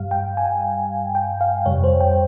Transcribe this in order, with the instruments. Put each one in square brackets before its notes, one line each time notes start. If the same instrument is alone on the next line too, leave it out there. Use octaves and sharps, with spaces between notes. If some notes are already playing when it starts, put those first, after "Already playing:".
Already playing: [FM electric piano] G2 G3 F5
G5
G#5
G5
F5
F2 C3 G3 C#5
C5
G5